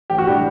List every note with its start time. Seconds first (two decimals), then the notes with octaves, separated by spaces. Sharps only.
0.10 A1 G4
0.18 F#4
0.27 A2 G3 D4 G4